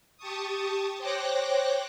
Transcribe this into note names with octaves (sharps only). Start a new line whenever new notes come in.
G4 A5 C#6 D#6
C5 C#5 G5 D6 F#6 A#6